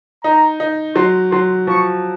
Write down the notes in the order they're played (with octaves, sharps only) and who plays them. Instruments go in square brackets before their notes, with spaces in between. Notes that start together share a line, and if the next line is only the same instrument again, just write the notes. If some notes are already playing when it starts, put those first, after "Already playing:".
[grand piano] D#4 [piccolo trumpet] A#5
[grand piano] D#4
[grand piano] F#3 [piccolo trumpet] C6
[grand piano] F#3 [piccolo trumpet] C6
[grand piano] F3 [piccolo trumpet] C#6